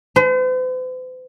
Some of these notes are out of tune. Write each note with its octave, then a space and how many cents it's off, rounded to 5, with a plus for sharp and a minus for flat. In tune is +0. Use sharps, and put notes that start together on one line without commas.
C5 -45